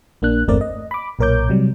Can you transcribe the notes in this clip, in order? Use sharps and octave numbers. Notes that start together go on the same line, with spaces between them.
A#1 A#3 D4 F#6
G1 E2 A3 C4 A#4 D5
D#5
B5 D6
B1 A#2 A#4 C#5 D6 G6
C3 F#3 G3